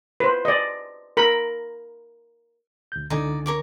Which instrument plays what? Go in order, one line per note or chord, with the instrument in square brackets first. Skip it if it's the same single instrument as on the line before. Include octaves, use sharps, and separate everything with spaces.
[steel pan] B4 C5
D5 D#5
A#4 B5
[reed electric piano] D2 G6
[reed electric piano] C#2 D3 G#5 [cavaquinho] D#4 D5
[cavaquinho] A#4 C#5 D6